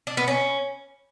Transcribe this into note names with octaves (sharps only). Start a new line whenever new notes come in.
D4
B3
C#4